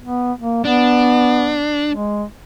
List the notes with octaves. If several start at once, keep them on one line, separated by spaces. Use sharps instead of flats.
B3
A#3
B3 D4
G#3